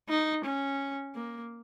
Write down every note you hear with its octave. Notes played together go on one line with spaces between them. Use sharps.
D#4
C#4
A#3